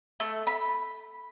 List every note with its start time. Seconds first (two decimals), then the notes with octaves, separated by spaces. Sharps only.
0.20 A3
0.47 B5